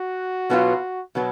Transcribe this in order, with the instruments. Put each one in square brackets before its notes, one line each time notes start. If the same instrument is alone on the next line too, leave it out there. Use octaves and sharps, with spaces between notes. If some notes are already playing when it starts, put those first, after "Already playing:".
Already playing: [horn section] F#4
[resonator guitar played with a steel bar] B2 F#3 B3 F4
B2 F#3 B3